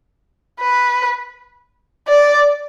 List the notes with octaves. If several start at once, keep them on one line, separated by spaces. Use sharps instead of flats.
B4
D5